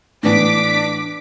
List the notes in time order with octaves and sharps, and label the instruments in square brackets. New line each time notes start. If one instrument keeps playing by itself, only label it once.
[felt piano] A2 E3 B3 [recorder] D4 [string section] D6 B6